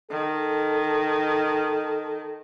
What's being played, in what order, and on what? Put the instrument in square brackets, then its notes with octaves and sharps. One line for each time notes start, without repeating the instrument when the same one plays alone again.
[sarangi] D#3 [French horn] A4